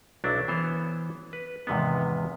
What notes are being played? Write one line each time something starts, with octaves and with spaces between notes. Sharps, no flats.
B1 F#3 D4 E4
E3 B3 C5 C#5
B4
E2 G#2 C3 D#3 B3